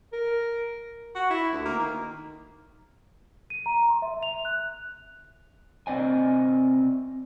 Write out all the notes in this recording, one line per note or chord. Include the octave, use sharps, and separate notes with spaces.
A#4
F#4
E4
D2
A#3
D#3
D#7
A#5
C6
E5
F7
F#6
C3 C4 D5 D#5 G#5